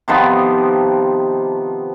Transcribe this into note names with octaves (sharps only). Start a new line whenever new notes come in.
C3 D#3 F3 B3